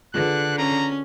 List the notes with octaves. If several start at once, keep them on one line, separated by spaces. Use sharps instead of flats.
D3 F4 G#4 B4 F#6
C#4 A#5